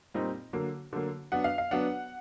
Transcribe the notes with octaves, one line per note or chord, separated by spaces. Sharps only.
A#2 G3 C4 D#4
D3 F#3 A#3
D3 F#3 A#3
F#3 B3 D4 F#5
F5
F5
F#3 B3 D4 F#5